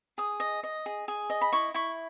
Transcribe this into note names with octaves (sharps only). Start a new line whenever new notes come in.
G#4 D#6
D#5
D#5
G#4
G#4
D#5
B5
E4 C#6
E4 C#6